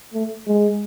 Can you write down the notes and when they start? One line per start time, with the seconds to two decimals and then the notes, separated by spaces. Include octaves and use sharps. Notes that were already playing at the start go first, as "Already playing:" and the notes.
0.14 A3
0.47 G#3